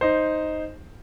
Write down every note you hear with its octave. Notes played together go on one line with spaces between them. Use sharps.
D#4 C5